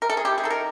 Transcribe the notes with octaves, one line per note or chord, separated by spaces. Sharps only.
A#4
A4
G#4
E4 G4
G#4
D#3 A4
A#4